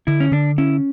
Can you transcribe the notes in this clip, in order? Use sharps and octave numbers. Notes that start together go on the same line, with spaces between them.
D3 E4
C#4
D3 D4
C#4 E4